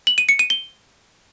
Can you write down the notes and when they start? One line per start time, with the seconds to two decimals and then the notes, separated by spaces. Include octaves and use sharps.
0.07 F#7
0.18 D#7
0.29 C#7
0.39 D#7
0.50 G7